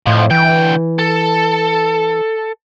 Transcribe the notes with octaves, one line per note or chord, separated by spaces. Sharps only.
F2 A2 F3
D2 E3 G5
A4